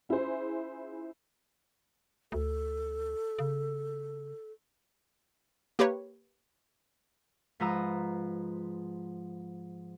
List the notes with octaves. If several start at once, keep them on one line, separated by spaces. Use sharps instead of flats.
C#4 E4 F4 G#4 C5
D2 A4
C#3
A#3 G4 B4 C#5
G#2 F3 B4 A#5 E6